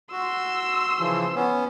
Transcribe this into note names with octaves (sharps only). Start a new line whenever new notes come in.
F#4 C6 E6
C#3 E3 F3
B3 C#4